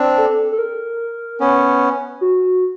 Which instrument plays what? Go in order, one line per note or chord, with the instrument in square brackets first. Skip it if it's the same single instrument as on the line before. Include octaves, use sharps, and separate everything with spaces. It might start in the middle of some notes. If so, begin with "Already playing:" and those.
Already playing: [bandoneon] C4 D4
[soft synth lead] A4
A4
A#4
[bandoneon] B3 C#4
[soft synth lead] F#4